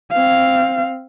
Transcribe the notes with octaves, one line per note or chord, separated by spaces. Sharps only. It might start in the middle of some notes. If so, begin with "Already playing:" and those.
C4 F5